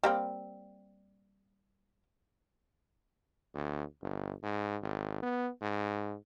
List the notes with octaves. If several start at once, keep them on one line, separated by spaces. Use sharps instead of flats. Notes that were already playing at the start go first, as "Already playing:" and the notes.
G3 A#3 C4
D2
G1
G#2
G#1
B3
G#2